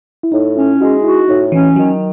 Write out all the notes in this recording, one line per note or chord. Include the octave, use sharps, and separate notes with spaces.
E4
A2 D#4
C#4 E4
G#3 F#4
E4 F#4
A2 D#4
E3 C#4
D#3 F#3